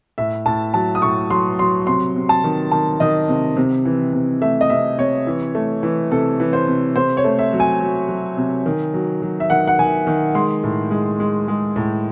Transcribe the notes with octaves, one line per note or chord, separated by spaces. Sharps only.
A2 E5
A2 A5
F#3 A5
D#6
A2 C#6
F#3 C6
F#3 C6
C3 C6
C3
A5
D#3
D#3 A5
D#3 D#5
C3
C3
E3
C3
A3 E5
D#5
C3 E5
C3 C#5
E3
A3
E3
C3 A4
E3
C5
C3
C3 C5
C#5
A3
E5
F#3
G#5
F#3
F#3
C3
D#3
F#3
F#3
E5
D#3 F#5
F#5
D#3 G#5
D#3
G#3 C6
A2
G#3
G#3
G#3
A2